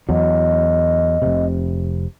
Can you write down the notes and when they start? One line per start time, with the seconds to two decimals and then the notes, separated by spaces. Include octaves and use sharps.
0.09 E2 F#3 D#5
1.22 F1 C3